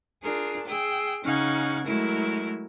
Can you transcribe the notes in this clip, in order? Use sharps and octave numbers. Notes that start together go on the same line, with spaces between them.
D4 F4 G#4 A#4
G#4 G5 E6
C#3 C#4 D#4 F5 F#5 G#6
F#3 G#3 A3 E4 A#4